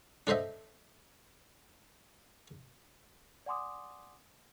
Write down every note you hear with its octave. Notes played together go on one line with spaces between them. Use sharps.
D4 A4 C5 D#5 E5
D5 F#5 G#5 C6 D6 D#6